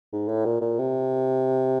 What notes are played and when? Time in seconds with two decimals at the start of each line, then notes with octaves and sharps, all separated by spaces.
0.12 G#2
0.28 A2
0.45 A#2
0.61 A#2
0.79 C3